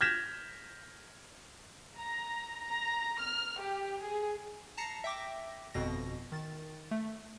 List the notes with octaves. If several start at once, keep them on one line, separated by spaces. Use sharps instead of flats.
F6 G6 G#6 A#6 B6 E7
A#5
A#5
F6
G4
G#4
A5 A#5 A#6 C7 C#7
E5 G5 D6 A#6
G1 F2 B2 A#6
D#3 A6
A3